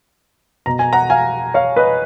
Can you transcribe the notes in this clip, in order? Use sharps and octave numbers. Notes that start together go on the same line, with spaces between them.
B2 A#5
G#5
F#5 A#5
F5 G#5
C#5 F5
B4 D#5